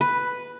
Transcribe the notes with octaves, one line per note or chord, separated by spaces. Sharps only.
B4